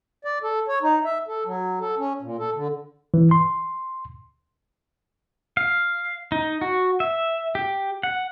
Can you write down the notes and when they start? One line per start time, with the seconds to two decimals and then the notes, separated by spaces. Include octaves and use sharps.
0.25 D5
0.43 A4
0.68 C#5
0.82 D#4
1.04 E5
1.28 A4
1.46 F#3
1.80 A4
1.98 C#4
2.22 A#2
2.39 A4
2.55 D3
3.14 E3
3.31 C6
5.57 F5
6.32 D#4
6.61 F#4
7.00 E5
7.55 G4
8.03 F#5